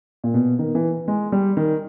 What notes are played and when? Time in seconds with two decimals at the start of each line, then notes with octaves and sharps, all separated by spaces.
0.24 A#2
0.34 B2
0.59 D#3
0.75 E3
1.08 G#3
1.32 G3
1.57 D#3